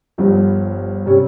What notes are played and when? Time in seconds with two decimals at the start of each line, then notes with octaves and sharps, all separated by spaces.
0.18 G1 G2 F3
1.06 C3 G3 C#4